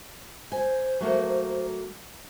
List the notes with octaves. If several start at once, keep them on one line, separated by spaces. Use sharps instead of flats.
C5 G#5
F#3 A3 A#3